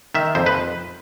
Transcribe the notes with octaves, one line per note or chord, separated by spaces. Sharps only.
D#3 E5
F2 C5
B4